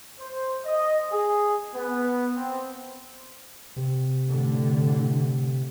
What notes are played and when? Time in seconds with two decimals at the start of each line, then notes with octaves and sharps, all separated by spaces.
0.20 C5
0.64 D#5
1.11 G#4
1.72 B3
2.35 C4
3.76 C3
4.25 A2 D3